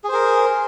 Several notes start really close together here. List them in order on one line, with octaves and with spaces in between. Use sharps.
G#4 C5 A#4